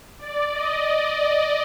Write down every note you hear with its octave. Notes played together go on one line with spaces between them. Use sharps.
D5
D#5
D5
D5